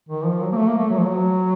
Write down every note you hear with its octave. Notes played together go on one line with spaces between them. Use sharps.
D#3
F3
F#3
A#3
A3
A#3
A3
F#3
F3
F#3